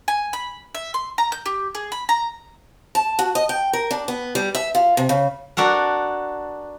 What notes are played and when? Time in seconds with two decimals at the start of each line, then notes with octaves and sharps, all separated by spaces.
0.08 G#5
0.33 B5
0.75 E5
0.94 C6
1.18 A#5
1.32 G6
1.46 G4
1.75 G#4
1.92 B5
2.09 A#5
2.95 A5
3.19 F#4
3.35 D#5
3.49 G5
3.73 A#4
3.91 D4
4.08 B3
4.35 G3
4.55 E5
4.75 F4
4.97 C3
5.09 C#3
5.57 D4 F#4 A4 A#4